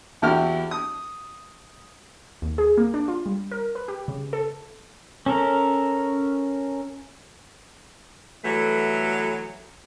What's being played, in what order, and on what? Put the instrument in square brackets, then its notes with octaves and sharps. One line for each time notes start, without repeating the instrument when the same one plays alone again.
[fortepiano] E2 E4 F#4 G4 F6
D#6
[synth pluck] D#2
G#4
A#3
D4
F4
G3
A#4
B4
G4
C#3
A4
[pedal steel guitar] C#4 A4 A#4
[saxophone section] E3 F#3 G3 A3 B3 A4